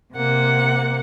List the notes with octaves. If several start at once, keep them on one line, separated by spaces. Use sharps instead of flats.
C3 A#3 F#5